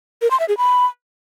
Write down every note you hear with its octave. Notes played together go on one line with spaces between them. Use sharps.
A#4
C6
E5
G#4
B5